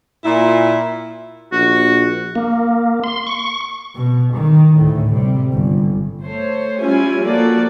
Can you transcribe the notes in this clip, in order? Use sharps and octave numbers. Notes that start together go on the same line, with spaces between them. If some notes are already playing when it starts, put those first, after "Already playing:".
A#2 E4
A#1 F#4
A#3
C6
C#6
B2
D#3
D2 A2
C3 G3
G1
A3 C5 C#5
G3 C#4 E4 F4 G#5
F3 A#3 F#4 A4 D5